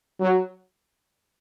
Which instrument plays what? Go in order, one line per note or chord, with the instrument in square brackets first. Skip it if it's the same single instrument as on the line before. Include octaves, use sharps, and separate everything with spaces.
[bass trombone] F#3